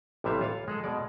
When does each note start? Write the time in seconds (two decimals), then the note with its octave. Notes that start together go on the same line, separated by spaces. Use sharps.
0.24 A1 C3 E3 G3 E5 F5
0.41 F4 C#5 F5
0.68 G#3 G#4 A4
0.84 B2 G#3 D5